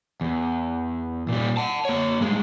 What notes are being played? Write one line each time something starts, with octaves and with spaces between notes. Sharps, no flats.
E2
A#2 G3
F#5 A5
A#3 C#5
G2 G#3